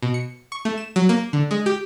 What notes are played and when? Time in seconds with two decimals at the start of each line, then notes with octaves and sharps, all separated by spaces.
0.02 B2
0.14 C#7
0.52 C#6
0.65 A3
0.78 E7
0.96 F#3
1.09 A#3
1.33 D3
1.51 G#3
1.66 G4